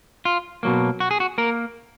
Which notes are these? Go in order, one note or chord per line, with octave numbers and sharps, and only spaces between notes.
F4
B2 F#3 A#3
F#4
G#4
F#4
A#3 A#4